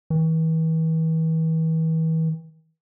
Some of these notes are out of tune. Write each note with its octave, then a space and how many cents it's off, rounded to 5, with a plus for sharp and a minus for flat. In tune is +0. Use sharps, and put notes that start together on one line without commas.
E3 -40